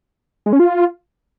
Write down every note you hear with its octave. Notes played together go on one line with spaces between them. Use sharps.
G#3
C#4
F4